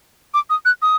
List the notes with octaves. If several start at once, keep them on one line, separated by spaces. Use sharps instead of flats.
D6
D#6
F#6
D#6